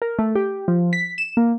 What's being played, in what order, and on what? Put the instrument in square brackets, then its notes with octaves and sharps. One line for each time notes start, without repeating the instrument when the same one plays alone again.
[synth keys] A#4
A3
G4
F3
B6
E7
A#3